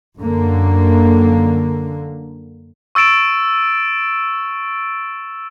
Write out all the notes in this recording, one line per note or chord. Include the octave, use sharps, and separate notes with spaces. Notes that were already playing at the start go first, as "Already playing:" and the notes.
F#2 D3 A#3
C#6 E6 A6 D7 E7